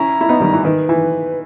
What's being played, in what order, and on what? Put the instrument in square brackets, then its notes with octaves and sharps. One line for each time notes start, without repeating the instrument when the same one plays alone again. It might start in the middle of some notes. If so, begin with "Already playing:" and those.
Already playing: [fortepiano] C#4 E4 [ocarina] A#5
[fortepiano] E4
B3 D#4
D#3 G3
E3
[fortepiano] D#3 [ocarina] B4
[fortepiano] E3